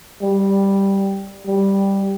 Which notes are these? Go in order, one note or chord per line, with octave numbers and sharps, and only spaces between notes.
G3
G3